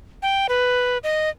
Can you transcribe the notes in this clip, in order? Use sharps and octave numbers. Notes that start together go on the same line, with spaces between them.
G5
B4
D#5